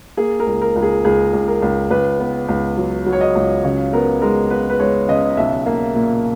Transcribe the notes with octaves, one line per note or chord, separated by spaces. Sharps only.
A#3 G#4
A#4
C#2
A#4
C#2
G#4
C#2 G#4
C#2
A#4
C#2
C#2 B4
B3
C#2
F#3
F#3
C#5
D#5
C#2
C#3 C#5
B3 A#4
G#3 A#4
B3 B4
B4
G#3 C#5
C#3 D#5
B1 E5
A#3
A#2